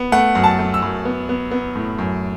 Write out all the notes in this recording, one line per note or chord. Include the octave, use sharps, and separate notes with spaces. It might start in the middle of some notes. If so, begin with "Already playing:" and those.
Already playing: B3
A3 F#5
F#2
A5
A3
E6
F#2
B3
B3
B3
A2
F#2